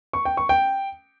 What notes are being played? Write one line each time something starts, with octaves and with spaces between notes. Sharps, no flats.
C#6
G5
C#6
G5